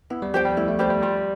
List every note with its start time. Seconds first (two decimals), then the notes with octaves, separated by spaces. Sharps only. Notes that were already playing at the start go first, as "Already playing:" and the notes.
0.10 B3 E4
0.22 G3
0.34 F3 G4 C5 G5
0.45 G3
0.57 A3 E4
0.68 A3
0.79 G3 G4 C5 G5
0.90 G3
1.02 G3 F4